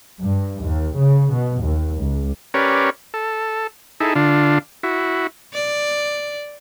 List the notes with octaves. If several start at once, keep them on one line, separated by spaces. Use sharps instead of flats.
G2
D#2
C#3
B2
D#2
C#2
C#4 G4 A#4 B4 C#5 D5
A4
D#4 E4 G#4 A4
D3 D4 F4
E4 F#4
D5